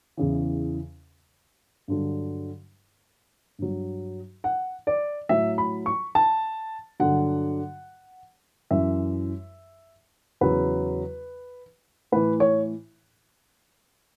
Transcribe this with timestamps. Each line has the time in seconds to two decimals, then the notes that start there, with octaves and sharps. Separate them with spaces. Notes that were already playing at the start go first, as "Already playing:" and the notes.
0.17 E2 C#3 E3
1.88 G2 D3 F#3
3.59 G2 F#3
4.44 F#5
4.87 D5
5.29 A2 F#3 E5
5.58 B5
5.86 C#6
6.15 A5
6.99 G2 D3 F#3 F#5
8.71 F#2 E3 E5
10.41 E2 C#3 F#3 B4
12.12 A2 E3 B4
12.40 C#5